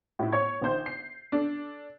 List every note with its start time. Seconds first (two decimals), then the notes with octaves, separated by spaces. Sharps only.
0.19 A2 E4
0.32 C#5 C#6 G#6
0.62 A#1 D#3 C5 G6
0.86 C7
1.32 D4 A4